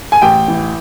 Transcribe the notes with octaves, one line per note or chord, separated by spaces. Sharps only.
G#5
A1 G5
E3